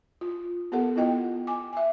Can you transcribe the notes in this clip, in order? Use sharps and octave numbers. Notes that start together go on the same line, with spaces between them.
F4
B3 G4 A4 A#4 F#5
B3 E4 F4 D#5 G5
G#5 D6
E5 G#5